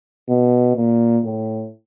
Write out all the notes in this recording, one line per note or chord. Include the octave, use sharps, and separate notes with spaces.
B2
A#2
A2